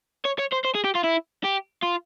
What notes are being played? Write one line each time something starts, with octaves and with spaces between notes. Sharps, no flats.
C#5
C#5
C5
C5
G#4
G4
F4
E4
G4
F4